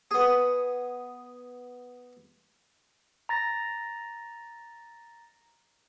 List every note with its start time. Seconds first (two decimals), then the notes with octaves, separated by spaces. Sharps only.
0.11 B3 G#4
3.29 A#5 A6 A#6